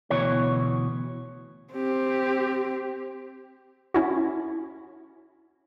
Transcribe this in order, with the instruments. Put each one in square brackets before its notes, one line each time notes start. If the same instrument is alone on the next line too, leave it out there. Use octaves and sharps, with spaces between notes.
[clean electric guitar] D2 B2 E3 C#5
[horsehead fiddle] C4 G4
[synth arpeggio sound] C#4 E4 F#4